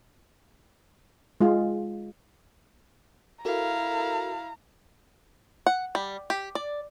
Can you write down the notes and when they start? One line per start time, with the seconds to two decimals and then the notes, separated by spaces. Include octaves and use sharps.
1.41 G#3 F4
3.45 E4 F#4 A4 A#4 F5 A#5
5.67 F#5
5.95 G3
6.30 G4
6.55 D5